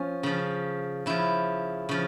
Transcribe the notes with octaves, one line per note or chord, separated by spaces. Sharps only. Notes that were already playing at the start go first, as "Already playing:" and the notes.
Already playing: F3 C#4
C#3 F3
C#3 F3 E4
C#3 F3